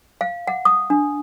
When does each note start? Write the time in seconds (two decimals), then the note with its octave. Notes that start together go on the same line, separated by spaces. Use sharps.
0.21 F5
0.47 F#5
0.65 D#6
0.90 D4